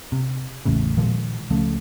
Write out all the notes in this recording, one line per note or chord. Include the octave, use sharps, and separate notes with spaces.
C3
A1 E2 A2 C#3
A#2 D#3 F3 G#3
C#2 F3 A3 C#4